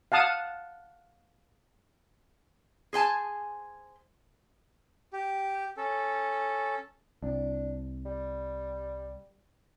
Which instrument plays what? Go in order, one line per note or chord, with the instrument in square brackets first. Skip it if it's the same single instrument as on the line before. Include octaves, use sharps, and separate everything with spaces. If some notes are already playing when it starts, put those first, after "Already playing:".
[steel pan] F5 F#5 A5 D#6
[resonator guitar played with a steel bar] G#4 C5 G#5 A5
[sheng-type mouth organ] G4
C#4 A4
[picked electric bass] C2 [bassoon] D4
[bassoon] G3